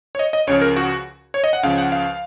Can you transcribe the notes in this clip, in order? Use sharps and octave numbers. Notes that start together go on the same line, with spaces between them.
C#5
D#5
D#5
C#2 C#3 F3 C#5
A#4
F#4
C#5
D#5
F#5
C#2 C#3 F3 F5
F#5
F5